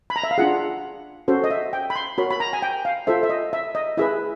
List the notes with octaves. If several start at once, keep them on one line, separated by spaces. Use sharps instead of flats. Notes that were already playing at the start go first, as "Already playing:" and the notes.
B5
A#5
E5
F5
D4 F4 G#4 F#5
C#4 F#4 A4 C5
D#5
E5
G5
B5
C6
F#4 A#4 C#5 B5
B5
A#5
G#5
G5
F5
F4 A4 C5 E5
E5
D#5
E5
D#5
E4 G#4 B4 E5